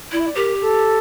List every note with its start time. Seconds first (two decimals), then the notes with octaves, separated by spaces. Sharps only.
0.12 E4 D5
0.19 E5
0.26 D5
0.35 G4 A#4
0.61 A4